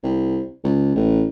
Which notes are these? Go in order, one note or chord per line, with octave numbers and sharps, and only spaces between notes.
C2
C#2
A1